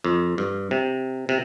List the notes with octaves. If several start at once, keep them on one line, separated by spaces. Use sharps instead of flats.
F2
G2
C3
C3